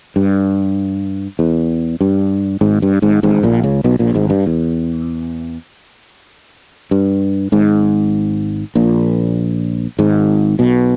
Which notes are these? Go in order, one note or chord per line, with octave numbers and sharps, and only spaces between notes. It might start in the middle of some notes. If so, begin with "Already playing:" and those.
G2
E2
G2
G#1 G#2
G2
G#1 G#2
G#1 G#2
A#1 A#2
C#2 C#3
B1 B2
A#1 A#2
G#1 G#2
G2
E2
G2
G#1 G#2
A#1 A#2
G#1 G#2
B1 B2